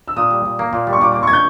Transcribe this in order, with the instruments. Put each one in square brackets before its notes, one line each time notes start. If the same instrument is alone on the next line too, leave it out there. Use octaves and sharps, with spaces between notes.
[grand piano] E6
[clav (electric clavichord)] A#2 [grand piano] D#6
[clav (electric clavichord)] G3
A#2
A#3
A#2
G3
[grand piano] C#6
[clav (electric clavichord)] A#2 [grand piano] D6
[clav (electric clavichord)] A#3 [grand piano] D6
[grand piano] C#6 G#6
[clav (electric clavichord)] A#2 [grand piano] G6